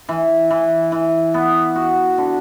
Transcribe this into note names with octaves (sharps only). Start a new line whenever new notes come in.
E3
E3
E3
B3
F#4
D3